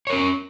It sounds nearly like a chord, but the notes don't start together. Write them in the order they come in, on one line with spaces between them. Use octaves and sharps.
C#5 A#4 C#4